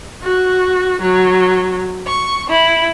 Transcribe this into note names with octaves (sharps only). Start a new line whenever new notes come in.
F#4
F#3
C#6
E4